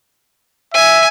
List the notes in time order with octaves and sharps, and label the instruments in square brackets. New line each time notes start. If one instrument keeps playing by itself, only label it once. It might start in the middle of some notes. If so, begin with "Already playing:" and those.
[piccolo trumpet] E5 [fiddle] G#5